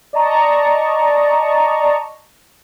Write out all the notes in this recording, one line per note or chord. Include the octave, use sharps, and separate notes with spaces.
D5 D#5 A5 A#5 C#6